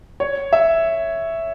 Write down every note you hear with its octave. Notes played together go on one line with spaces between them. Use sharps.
C#5
E5